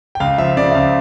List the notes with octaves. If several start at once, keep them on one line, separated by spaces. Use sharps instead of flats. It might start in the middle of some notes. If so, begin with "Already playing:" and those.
G5
C#2 F5
F3 E5
C#3 D5
E5
C#2 F5